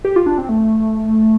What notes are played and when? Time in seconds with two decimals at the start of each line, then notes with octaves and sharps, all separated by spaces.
0.05 G4
0.16 F4
0.26 D4
0.38 C4
0.49 A3